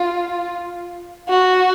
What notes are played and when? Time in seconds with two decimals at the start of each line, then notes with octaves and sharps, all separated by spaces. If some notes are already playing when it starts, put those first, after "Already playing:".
Already playing: F4
1.29 F#4